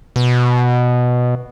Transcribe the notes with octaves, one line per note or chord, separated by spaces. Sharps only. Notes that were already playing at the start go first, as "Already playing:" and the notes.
B2